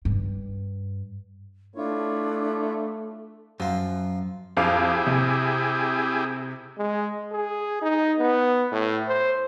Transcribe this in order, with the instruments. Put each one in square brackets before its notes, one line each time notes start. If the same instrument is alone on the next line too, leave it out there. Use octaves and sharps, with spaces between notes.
[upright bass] G2
[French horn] A3 [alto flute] D4 [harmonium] E4 F4 C#5
[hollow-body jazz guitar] F#2 [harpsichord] F3 F4
[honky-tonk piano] F2 F5 D6 [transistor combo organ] E4 G4 G#4
[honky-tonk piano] C3
[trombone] G#3
G#4
D#4
B3
A2
C5